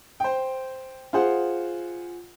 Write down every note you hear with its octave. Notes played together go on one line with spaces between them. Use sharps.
C5 G5
F4 G#4 C5 F#5